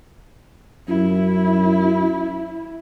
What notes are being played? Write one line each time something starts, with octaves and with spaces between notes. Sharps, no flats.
F#2 E4